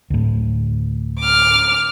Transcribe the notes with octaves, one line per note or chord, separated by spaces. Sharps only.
D2 A2
D6 F6